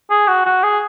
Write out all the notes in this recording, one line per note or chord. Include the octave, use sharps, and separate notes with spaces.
G#4
F#4
F#4
G#4